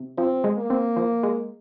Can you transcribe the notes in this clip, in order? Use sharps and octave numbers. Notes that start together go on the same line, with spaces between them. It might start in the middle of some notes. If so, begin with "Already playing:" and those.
Already playing: C3
F3 C4
G#3
A#3
C4
F3
G#3